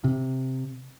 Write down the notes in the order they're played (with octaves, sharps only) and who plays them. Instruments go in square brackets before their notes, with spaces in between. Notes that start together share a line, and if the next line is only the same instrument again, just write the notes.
[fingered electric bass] C3